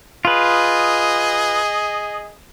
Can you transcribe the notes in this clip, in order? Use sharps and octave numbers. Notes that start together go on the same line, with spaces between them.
F4 G#4 B4 D#5